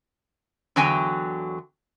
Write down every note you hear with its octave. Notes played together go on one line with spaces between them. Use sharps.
E2 D3 F#3 F#4 G5 G#5